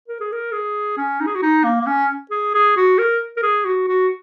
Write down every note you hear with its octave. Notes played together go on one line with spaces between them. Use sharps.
A#4
G#4
A#4
G#4
C#4
D#4
G#4
F#4
D#4
A#3
A#3
C#4
G#4
G#4
F#4
A#4
A#4
G#4
F#4
F#4